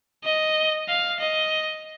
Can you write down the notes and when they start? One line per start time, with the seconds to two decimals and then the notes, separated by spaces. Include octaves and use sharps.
0.24 D#5
0.89 F5
1.20 D#5